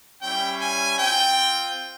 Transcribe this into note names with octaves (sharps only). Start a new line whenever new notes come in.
G3 C#4 E4 G5
G#5
C4 F4 G5